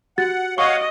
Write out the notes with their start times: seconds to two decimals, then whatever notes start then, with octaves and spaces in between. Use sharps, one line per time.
0.18 F#4 G4 F#5 A6
0.58 C#5 D#5 F5 F#5 C#6